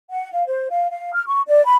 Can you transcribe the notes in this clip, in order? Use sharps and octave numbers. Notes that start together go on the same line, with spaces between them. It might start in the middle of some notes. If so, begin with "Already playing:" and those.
F#5
F5
C5
F5
F5
F6
C#6
D5
B5